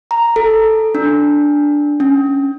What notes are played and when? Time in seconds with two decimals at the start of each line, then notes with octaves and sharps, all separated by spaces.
0.11 A#5
0.36 A4
0.95 D4
2.00 C#4